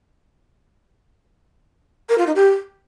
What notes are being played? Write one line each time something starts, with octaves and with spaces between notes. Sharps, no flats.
A#4
F4
D#4
G4